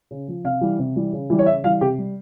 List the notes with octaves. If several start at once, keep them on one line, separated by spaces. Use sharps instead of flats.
C#3
F3
C3 F5
E3 G3
C3
E3 G3
C#3
E3 G3
C#5
C#3 E5
E3 G3 F5
C3 G4
G3